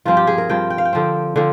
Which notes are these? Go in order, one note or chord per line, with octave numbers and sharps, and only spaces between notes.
G2 F3 C4 F4
G4
G#4
A#4
G2 F3 C4 G5
G5
F5
G5
D3 F3 C4
D3 F3 C4